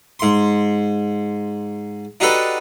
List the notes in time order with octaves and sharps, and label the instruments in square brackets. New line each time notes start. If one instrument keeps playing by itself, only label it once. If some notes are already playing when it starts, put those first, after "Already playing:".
[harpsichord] G#2 C6
D4 D#4 F#4 G4 A4 B4